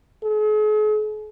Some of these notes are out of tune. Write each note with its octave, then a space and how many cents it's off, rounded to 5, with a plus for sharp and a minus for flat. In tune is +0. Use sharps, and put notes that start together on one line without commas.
G#4 +45